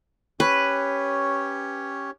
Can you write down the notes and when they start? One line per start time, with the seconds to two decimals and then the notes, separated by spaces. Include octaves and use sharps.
0.40 C#4 G4 B4 C#5